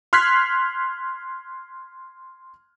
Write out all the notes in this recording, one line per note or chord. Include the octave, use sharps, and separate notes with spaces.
C6 F6 F#6 G#6 B6 C7